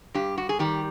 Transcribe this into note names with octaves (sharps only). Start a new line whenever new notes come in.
G2 G4
F#4
G#4
D#3 G3 G4